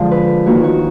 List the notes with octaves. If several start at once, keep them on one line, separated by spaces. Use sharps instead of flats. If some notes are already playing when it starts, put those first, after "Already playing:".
Already playing: D3 F3 G#3
B4
D#2 D#3 A#3 D#4 F#4
F#4